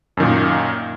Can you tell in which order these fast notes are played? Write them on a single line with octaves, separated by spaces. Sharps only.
F#2 D#3 A#2